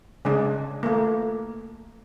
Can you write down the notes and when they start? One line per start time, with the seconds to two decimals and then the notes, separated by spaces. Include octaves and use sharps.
0.25 C#3 G#3 D4
0.83 A3 A#3